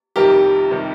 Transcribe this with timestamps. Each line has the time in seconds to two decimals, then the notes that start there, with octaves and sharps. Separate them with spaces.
0.16 F2 C3 D#3 G3 G4 A#4
0.71 C3 D#3 G3